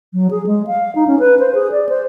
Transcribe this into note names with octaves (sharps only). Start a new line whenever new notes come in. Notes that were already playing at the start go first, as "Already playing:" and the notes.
F#3
G#4
G#3
F5
D#4
C#4
B4
C5
G#4
D5
C5